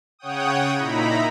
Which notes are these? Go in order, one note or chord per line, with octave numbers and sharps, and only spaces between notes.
C#3 C#5 F#5 G5 D#6
A#2 D#4 E4 A#5 B5